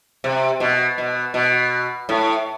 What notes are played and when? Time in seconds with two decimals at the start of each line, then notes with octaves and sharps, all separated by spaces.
0.24 C3
0.60 B2
0.98 B2
1.34 B2
2.09 A2